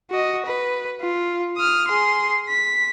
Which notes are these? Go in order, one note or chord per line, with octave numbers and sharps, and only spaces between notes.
F#4 D#5
B4
F4
D#6 F6
G#4 C6
B6